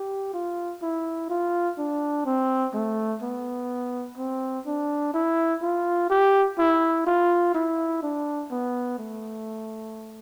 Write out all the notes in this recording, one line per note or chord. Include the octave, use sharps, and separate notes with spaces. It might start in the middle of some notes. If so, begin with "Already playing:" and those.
Already playing: G4
F4
E4
F4
D4
C4
A3
B3
C4
D4
E4
F4
G4
E4
F4
E4
D4
B3
A3